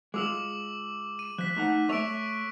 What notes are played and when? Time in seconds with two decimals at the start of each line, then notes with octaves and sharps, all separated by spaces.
0.14 G#3 F4 D6 E6 F#7
1.19 D#7
1.38 F3 F#6 B6
1.57 A3 D#4 F#5
1.89 A3 C#5 E5 C#6 E6 D7